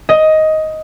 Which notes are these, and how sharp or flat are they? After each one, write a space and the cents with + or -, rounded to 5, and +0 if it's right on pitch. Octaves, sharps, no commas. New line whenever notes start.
D#5 +10